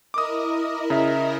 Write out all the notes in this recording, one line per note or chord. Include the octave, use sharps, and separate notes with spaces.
E4 A#4 D#5 D6 D#6
C#3 E5 A#5